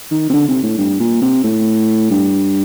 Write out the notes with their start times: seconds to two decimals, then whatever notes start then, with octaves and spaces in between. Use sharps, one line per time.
0.11 D#3
0.30 C3
0.33 D3
0.48 C3
0.63 A2
0.77 G2
1.00 A#2
1.21 C3
1.44 A2
2.10 G2